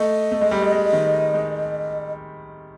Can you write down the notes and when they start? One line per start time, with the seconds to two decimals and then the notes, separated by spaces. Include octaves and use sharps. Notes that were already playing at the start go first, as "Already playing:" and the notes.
Already playing: A3 D#5
0.32 A3
0.41 G#3
0.51 G3
0.62 G#3
0.72 G#3
0.93 D#3
1.34 G#3